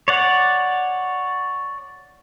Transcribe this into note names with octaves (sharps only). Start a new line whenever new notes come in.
C#5 D5 F#5